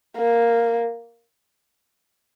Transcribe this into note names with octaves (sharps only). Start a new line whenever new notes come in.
A#3